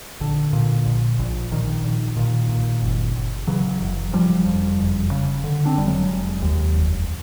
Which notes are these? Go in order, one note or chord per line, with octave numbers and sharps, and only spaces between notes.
A#1 D3
A#2
A#1
A#1
A#1 D#3
A#1
A#2 D#3
A#2
F#1
F#1
C#3 E3 F#3
F#1
F#1 F3 G3
F2
F#1
C#3
D3
C4 D4
F1 G3
F#3 G#3
F1
D#2
F1